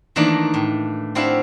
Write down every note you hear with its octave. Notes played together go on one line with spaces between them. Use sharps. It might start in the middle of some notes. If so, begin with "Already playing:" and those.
D#3 E3 A3 A#3 D4
A2
C4 D4 E4 F#4 E5 F5